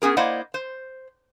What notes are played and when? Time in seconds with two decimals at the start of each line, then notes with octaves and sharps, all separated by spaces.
0.02 B3 C#4 G#4 A#4
0.17 A#3 E4 C5 D5 D#5 F#5
0.54 C5